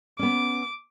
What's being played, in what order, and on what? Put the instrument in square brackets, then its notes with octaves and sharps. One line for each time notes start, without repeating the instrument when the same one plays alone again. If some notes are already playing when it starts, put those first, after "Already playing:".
[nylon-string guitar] B3 C#4 [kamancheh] D6